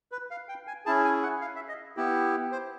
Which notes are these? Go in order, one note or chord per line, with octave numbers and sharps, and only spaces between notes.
B4
F5
G5
G#5
C#4 E4 G#4 A5
G#5
F#5
F5
E5
D#5
B3 E4 G4
C5